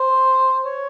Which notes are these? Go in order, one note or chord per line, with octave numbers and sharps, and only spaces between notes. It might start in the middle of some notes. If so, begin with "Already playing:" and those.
Already playing: C5
C#5